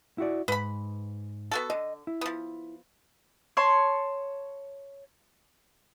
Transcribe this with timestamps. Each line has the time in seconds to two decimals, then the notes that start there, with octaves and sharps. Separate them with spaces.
0.18 E4 F#4 D5
0.48 G#2 B4 B5
1.51 B3 F#4 A4
1.70 D3 D#5
2.07 E4
2.21 F3 B3
3.57 C#5 A5 C6